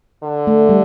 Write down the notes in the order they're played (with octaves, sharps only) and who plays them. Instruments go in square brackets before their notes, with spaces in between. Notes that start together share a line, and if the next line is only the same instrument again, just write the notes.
[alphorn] D3
[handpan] A3
G3